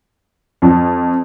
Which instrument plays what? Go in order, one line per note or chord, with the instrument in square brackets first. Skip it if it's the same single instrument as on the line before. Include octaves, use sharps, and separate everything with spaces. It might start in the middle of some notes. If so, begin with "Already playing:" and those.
[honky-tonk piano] F2